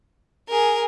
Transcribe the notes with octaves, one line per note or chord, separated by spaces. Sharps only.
G#4 A#4 G#5